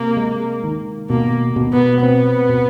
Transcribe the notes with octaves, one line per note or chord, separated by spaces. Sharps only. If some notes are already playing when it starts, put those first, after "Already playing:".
Already playing: C3 A#3
G#3
D#3
B2 A#3
B2
B3
B3 C4
B2